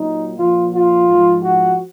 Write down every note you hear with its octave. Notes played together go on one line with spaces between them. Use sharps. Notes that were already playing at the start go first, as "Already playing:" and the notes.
Already playing: A#2 F#3 D#4
A#2 F3 F4
F4
G#2 F3
F#4